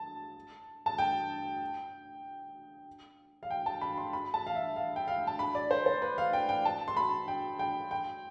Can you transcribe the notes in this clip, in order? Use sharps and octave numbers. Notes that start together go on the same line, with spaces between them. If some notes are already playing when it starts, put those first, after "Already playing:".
Already playing: A5
A5
G5
F5
G5
A5
B5
C6
B5
A5
F5
E5
F5
G5
F5
A5
B5
D5
C5
C5
B4
F5
G5
G5
A5
C6
B5
G5
G5
G5